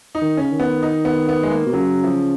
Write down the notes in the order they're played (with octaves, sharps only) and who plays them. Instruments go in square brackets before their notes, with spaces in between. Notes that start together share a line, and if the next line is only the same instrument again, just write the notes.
[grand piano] D#4
[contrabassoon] D#3
[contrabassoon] C#3 [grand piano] C#4
[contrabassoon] D#3
[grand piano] B3
D#4
B3
B3
G#3
A#3
[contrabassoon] B2
[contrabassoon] C#3 [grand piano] F#3
[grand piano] F3